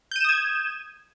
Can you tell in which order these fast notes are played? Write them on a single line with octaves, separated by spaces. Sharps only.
G6 D#7 E7 D#6 G#6